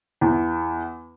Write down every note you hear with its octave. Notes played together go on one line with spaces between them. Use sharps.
E2